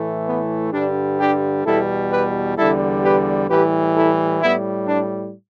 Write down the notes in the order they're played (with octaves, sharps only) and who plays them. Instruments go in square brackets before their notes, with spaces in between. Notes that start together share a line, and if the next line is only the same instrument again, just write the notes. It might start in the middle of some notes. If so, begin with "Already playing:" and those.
Already playing: [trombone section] A2 E3 A3
B3
G2 D3 G3 D4
D4 G4
E2 B2 G3 E4 A4
G4 B4
E2 D3 G3 E4 A4
G4 B4
A2 E3 G3 G4 B4
E4 A4
A2 G3 B3 E4
D4